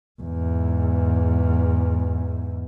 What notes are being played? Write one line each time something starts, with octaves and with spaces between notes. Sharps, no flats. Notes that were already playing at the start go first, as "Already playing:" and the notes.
E2 G#2